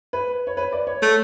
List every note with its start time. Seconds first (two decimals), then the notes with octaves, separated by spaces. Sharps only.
0.13 B4
0.47 C#5
0.57 B4
0.72 D5
0.87 C#5
1.02 A3